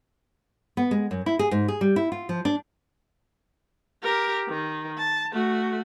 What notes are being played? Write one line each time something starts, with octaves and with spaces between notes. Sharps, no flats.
B3
G#3
F#2
E4
G#4
G#2
G#4
G3
E4
F4
F3
D4
G4 A#4
D#3
A5
A3 F#4